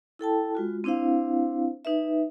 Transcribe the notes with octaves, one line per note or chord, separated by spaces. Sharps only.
E4 A4 G5 A5
G#3 F4 F#4
C4 D4 E4 C5 F5
D#4 B4 E5